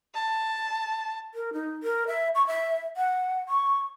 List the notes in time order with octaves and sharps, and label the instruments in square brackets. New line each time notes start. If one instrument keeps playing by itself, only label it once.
[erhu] A5
[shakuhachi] A#4
D#4
A#4
E5
C#6
E5
F#5
C#6